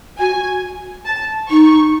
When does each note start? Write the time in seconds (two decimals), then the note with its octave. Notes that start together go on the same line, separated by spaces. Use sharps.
0.19 F#4 G#5
1.06 A5
1.49 D#4 C#6